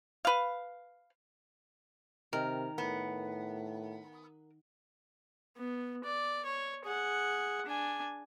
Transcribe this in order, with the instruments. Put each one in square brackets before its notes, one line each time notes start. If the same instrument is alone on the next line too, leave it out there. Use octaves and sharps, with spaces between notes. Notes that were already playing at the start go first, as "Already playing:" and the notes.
[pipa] B4 F5
[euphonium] C3 [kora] D#3 [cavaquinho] A#4
[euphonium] A2 [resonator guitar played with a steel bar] B3
[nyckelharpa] B3
D5
C#5
G#4 F#5
D4 G#5